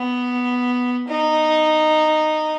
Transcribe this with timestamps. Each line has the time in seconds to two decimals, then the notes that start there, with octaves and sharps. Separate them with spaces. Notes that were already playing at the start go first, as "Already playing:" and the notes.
Already playing: B3
1.08 D#4